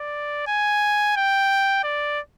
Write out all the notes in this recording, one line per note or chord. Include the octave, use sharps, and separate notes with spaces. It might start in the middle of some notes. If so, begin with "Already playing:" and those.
Already playing: D5
G#5
G5
D5